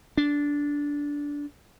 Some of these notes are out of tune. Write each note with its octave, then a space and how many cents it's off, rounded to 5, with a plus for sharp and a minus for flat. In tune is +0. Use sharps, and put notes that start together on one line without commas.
D4 -15